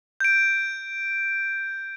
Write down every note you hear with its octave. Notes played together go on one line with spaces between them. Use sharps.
G6 D7